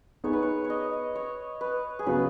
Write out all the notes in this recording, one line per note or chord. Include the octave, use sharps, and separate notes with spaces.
B3 D#4 G#4 C#5
B4
C#5
C#5
D#5
C#5
B4
G#4
C#3 F#3 B3 B4